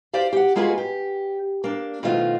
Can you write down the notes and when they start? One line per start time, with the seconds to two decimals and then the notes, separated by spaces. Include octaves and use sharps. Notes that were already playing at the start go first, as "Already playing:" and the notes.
0.14 G4 C5 D5 F5
0.33 G4 F#5
0.56 G#3 A#3 F4 F#4 G#4 B4
0.78 G4
1.64 A#3 D4
2.03 B2 D#3 F3 A3 F4 F#4